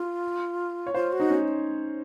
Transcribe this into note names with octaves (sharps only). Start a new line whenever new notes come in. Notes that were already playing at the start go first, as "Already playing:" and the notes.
Already playing: F4
C#5
F4 C5
F#4
D#4
C#4